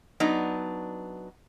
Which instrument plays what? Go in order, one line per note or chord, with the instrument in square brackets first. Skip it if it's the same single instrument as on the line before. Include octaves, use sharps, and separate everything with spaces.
[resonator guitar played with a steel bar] F#3 B3 D4 D#4